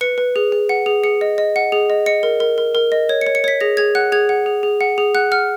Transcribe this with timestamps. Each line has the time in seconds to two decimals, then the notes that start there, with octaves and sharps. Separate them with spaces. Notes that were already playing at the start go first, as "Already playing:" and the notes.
0.01 B4 C#7
0.18 B4
0.36 G#4
0.52 G#4
0.69 F#5
0.86 G#4
1.04 G#4 C#7
1.21 D#5
1.38 D#5
1.56 F#5
1.72 G#4
1.90 D#5
2.06 D#5 C#7
2.23 A#4
2.40 A#4
2.58 A#4
2.75 A#4
2.92 D#5
3.09 C#5
3.21 C#7
3.27 C#5
3.35 C#7
3.44 C#5 B6
3.61 G#4 A#6
3.77 G#4 G#6
3.95 F#5 F#6
4.12 G#4 G#6
4.29 F#5
4.46 G#4
4.63 G#4
4.81 F#5
4.98 G#4
5.15 F#5 F#6
5.32 F#5 F6